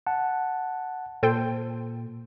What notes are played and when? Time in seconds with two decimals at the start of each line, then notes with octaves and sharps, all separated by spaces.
0.07 F#5 A5
1.23 A#2 A4 C5 G5